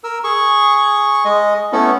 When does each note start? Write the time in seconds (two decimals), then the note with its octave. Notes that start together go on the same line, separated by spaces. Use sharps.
0.04 A#4 E6
0.24 G#4 C#6
1.25 G#3 D#5
1.72 A3 B3 C#4 E4 A4